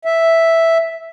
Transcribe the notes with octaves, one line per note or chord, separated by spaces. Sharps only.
E5